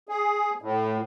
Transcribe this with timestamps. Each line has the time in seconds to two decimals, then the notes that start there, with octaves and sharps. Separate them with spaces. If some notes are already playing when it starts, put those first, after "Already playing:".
0.09 G#4
0.62 A2